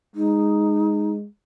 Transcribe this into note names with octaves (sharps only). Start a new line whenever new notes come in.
G#3 D#4